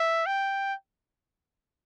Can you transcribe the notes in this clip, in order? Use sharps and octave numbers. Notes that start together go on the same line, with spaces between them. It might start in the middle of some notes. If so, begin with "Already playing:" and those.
Already playing: E5
G5